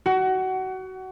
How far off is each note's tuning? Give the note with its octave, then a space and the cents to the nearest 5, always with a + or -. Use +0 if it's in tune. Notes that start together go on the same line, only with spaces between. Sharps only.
F#4 +25